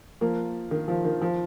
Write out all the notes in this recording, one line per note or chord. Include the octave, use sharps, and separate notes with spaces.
F3 A#3
D#3
F3
D#3
F3